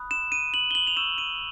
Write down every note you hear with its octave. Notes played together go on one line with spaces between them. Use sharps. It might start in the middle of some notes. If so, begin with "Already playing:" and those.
Already playing: B5 D#6 F#6
E7
D#7
F#7
G7
F#7
F7
C#6 E6 G6 E7
D#7